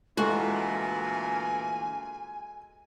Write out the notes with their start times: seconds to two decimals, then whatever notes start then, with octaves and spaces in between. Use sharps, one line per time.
0.17 D2 A#2 E3 G#3 F#4 A4 G#5